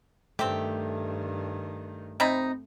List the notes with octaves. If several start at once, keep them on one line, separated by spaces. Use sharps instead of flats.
G2 D#3 A3 C4 G4
C3 C4 D#4 B5